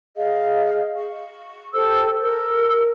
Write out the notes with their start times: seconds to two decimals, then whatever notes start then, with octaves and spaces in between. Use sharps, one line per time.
0.17 G#4 D#5 F5
0.98 C#6
1.74 G4 A4 C5 E6
2.22 A#4 E6